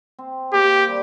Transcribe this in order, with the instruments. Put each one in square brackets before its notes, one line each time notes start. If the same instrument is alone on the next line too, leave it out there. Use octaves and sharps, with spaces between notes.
[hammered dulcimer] C4
[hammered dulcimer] A#3 [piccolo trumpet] G4
[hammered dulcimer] G3